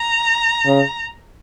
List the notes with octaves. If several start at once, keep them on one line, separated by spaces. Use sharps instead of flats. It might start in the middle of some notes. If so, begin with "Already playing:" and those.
Already playing: A#5
C#3